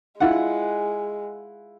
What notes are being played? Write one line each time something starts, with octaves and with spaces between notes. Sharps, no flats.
G#3 E4 F4 F#5